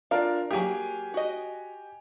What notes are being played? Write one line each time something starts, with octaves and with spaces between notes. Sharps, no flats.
D4 F4 A#4 F5
F#3 A#3 G4 G#4 G#5
F#4 D#5